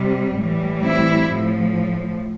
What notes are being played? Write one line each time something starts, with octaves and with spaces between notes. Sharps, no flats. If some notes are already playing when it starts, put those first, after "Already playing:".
Already playing: C3 G3
A2 E3 G3
C4 E4
A2 F3